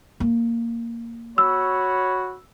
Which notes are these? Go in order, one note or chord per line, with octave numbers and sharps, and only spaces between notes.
A#3
F#4 C#5 B5 E6